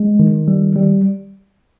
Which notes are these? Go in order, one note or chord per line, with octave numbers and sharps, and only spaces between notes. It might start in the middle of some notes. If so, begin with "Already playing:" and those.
Already playing: G#3
D#3
G3
G3